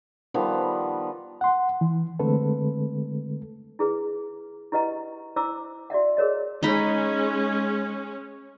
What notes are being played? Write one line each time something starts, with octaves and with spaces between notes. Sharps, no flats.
D#3 F3 G3 B3
F#5 C6
E3
D3 G#3 A3 C4 A4 B4
E4 G#4 B4
E4 G4 B4 D#5 F#5 A#5
E4 C5 A#5 D6 E6
F#4 D5 E5 F#5
G#4 A#4 C#5 D#5
G#3 C#4 D#4 D#5 B5